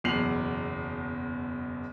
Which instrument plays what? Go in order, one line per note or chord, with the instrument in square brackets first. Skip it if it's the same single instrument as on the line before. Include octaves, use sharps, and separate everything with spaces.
[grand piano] F#1 E2 B2 C7 F7 F#7